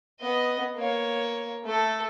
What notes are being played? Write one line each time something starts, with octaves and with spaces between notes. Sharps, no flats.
B3 D#5
A#3 C#5
A3 A4